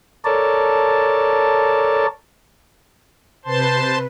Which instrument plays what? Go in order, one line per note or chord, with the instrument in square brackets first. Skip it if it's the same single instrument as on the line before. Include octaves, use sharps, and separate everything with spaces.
[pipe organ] A4 A#4 C#5 D5 A5
[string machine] C3 B4 [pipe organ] C5 A5 C6